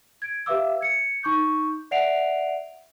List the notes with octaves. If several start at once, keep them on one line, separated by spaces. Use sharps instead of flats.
G#6 D7
G4 B4 E5 F5 D6 E6
G#6 C#7
D#4 C#6 D6 G6
D5 E5 F#5 C7 D7 F7